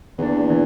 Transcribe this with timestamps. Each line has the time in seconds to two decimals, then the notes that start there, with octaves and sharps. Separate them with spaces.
0.18 E2 E3 A#3 D4
0.50 E3